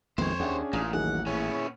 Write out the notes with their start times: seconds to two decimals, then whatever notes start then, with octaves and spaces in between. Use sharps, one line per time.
0.18 A#1 F2 D#3 G#3 B3 C5 C#5
0.40 D#2 C#4 D4 G#4 E5 F#5 G5
0.73 A1 A#2 A#5 D#6
0.93 D#2 D#3 F#3 G#4 F#5
1.26 A#2 B3 C#4 E4 G#4 C#5